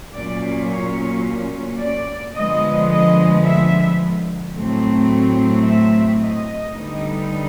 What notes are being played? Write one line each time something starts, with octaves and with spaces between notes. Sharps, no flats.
A#2 F#3 A#3 C#4 D5
C#5
D5
D3 F3 G#3 B3 D#5
D#5
E5
A2 F#3 A3 C4
E5
D#5
D3 G3 B3 D#4